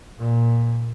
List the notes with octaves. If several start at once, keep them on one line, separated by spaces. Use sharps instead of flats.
A#2